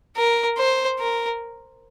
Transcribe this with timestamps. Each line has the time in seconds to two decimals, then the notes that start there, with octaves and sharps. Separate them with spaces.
0.16 A#4
0.57 C5
0.99 A#4